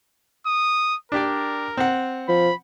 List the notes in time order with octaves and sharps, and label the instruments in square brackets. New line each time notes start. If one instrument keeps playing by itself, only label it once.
[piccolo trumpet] D#6
[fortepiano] D4 G4 D5 [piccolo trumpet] A#4
[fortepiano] C4 F#5
[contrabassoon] F3 [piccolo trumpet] B5